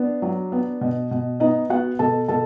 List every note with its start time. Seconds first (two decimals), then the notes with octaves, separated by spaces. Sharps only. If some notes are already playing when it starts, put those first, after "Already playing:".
Already playing: B3 D4
0.22 F#3
0.52 B3
0.81 B2
1.11 B2
1.40 B3 D#4 D#5
1.70 B3 F#4 F#5
1.99 B2 A4 A5
2.28 B2 A4 A5